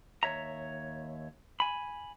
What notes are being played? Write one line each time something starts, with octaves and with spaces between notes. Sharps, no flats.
D#2 C#5 E5 A#5
G#5 B5